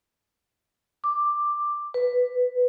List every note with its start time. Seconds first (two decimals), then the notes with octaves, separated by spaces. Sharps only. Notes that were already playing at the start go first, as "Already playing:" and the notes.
1.04 D6
1.94 B4